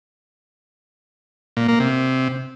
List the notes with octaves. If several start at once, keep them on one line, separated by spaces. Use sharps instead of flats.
A#2
A#3
C3